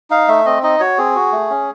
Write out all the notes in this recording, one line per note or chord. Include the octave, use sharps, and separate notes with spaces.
D#4 F5
A3 E5
C4 D#5
D#4 D#5
F#4 C#5
C4 G#4
F#4
A3
C#4